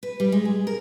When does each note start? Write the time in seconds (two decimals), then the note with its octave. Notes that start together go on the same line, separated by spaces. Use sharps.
0.03 B4
0.20 G3
0.32 G#3
0.45 G#4
0.67 A#4